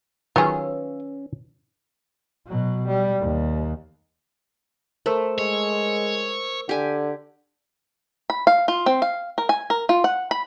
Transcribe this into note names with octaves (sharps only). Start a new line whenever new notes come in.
D#3 F#3 C#4 F4 G#4 B4
B2 F#3
G3
D#2
A3 A#4 C5 E6
G#3 C#5
D3 G4 G#5
B5
F5
F4
C4
F5
A#4
G#5
A#4
F4
F#5
B5